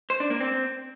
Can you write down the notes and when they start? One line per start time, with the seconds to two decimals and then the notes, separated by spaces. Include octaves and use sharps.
0.10 C5
0.20 D4
0.30 A#3
0.41 C4